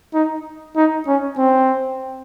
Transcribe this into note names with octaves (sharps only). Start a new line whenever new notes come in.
D#4
D#4
C#4
C4